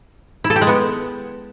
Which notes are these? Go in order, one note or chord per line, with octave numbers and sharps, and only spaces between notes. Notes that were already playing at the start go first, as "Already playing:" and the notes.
E4
A4
G4
G#3
B3